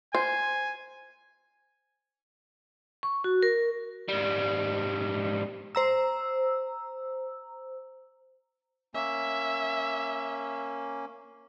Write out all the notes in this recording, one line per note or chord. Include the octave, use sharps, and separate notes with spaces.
C5 G#5
C#6
F#4
A#4
G#2 G3
C5 A#5 E6
A#3 C#4 E5